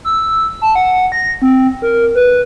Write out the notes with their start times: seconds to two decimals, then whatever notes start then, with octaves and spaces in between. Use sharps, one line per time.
0.05 E6
0.62 A5
0.75 F#5
1.12 A#6
1.42 C4
1.82 A#4
2.15 B4